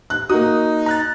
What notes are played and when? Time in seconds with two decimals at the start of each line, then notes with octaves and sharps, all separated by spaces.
0.10 F#6
0.30 A#3 D#4 F#4 D#6
0.86 A#5 F#6 A6